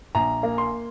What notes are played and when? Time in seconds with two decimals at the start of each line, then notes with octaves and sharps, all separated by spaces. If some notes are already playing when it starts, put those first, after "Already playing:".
0.15 A#1 A#5
0.43 A#3
0.58 C6